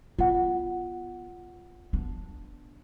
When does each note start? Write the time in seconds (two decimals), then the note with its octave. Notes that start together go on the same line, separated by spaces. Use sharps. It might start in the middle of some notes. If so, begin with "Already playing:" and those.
0.19 B3 F4 F#5
1.93 B3 D4